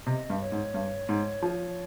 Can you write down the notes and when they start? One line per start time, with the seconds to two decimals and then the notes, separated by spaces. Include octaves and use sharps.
0.07 C3 D#5
0.30 G2
0.41 C#5
0.52 G#2
0.74 G2
1.09 G#2
1.42 F3